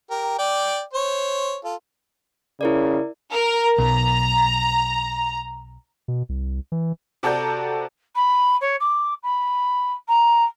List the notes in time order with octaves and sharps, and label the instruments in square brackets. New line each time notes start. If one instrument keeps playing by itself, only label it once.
[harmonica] G4 A#4
D5 G5
C5 C#5
F4 A4
[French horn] C#3 [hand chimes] E4 A#4 D5
[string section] A#4
[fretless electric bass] B1 [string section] A#5
[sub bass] B2
C2
E3
[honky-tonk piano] C3 F#4 A4 D5 A#5 G6
[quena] B5
C#5
D6
B5
A#5